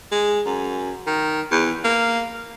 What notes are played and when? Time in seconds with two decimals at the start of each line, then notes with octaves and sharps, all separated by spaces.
0.12 G#3
0.46 F#2
1.07 D#3
1.51 E2
1.84 A#3